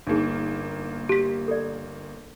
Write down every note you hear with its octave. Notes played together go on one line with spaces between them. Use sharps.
G1 A#3 D4 D#4 G#4
G4 B6
A4 D5